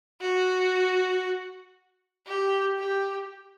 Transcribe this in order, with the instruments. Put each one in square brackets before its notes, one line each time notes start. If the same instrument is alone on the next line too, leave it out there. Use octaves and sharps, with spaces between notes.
[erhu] F#4
G4
G4